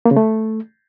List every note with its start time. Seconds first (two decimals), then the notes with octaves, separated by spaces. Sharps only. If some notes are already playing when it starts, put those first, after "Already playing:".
0.05 A#3
0.11 C#3
0.16 A3